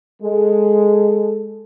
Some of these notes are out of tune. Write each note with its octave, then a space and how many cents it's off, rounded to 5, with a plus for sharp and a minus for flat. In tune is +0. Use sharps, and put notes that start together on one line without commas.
G#3 +0 A4 +0